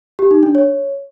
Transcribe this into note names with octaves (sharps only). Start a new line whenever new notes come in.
G4
D#4
D4
C#5